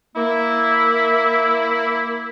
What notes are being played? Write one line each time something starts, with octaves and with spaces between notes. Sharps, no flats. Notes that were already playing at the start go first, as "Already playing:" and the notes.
A#3 E4